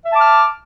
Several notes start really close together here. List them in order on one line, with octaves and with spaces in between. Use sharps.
E5 A5 D6 F6